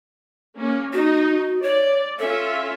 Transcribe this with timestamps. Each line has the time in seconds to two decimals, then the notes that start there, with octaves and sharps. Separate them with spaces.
0.56 A#3 C#4
0.93 D#4 F#4
1.63 C#5 D5
2.19 C#4 F4 A4 E5